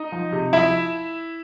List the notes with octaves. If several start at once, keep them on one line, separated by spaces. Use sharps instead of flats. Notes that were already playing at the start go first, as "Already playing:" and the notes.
Already playing: D#4 D#5
F3
C3
F3 E4 E5